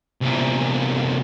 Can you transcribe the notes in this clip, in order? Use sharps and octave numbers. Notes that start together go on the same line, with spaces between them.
C2 A#2